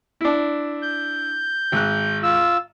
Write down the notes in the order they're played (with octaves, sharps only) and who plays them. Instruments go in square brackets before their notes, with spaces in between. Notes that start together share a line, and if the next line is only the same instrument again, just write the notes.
[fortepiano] D4 E4
[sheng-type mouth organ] G6
[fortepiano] G#1 F#6
[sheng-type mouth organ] F4 E6